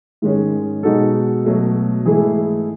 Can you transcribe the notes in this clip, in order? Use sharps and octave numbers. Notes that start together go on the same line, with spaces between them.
G#2 D#3 G#3 C#4
B2 G#3 D#4 F#4 A4
B2 F#3 A3
G#2 E3 A3 E4 G#4